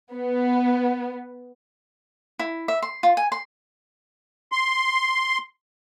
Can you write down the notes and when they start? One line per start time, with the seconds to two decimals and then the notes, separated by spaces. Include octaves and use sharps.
0.14 B3
2.39 E4
2.68 E5
2.82 C6
3.03 F4
3.17 G#5
3.32 C6
4.52 C6